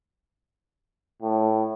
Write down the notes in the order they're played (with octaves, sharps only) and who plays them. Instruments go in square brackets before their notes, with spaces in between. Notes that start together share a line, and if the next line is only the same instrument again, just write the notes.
[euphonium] A2